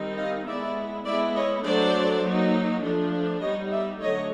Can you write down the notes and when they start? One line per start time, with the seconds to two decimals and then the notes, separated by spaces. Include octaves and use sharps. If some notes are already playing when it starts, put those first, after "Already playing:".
Already playing: D#3 G3 C4 D#4
0.17 D#5 F5
0.47 G#3 B3 E4 D5 E5
1.05 G#3 B3 E4 D5 E5
1.35 C#5 D#5
1.64 F#3 A3 D4 C5 D5
2.24 F#3 A#3 D#4
2.83 F3 A3 D4
3.41 G3 B3 D#4 C#5 D#5
3.72 D5 E5
4.00 D3 F#3 A3 C#5 D#5